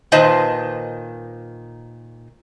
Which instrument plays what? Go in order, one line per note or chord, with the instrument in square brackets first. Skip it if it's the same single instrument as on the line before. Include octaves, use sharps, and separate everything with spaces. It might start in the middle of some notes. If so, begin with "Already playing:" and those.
[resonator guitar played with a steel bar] A#2 D#3 B4 C5 D#5 A5